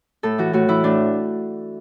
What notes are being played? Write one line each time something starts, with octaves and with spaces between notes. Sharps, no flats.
A2 A4
E3 F#4
A2 F#4
E3 E4
A2 D4